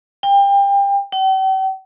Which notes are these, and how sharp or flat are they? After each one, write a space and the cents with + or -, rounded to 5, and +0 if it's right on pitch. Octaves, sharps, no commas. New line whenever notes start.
G5 +30
G5 -45